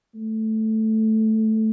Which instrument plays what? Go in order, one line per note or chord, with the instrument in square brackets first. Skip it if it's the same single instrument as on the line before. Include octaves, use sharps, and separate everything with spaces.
[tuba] A3